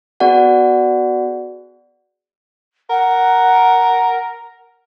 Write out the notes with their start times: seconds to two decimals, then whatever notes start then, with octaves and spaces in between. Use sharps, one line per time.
0.20 B3 F#4 G#4 D5 F#5
2.90 A#4 F#5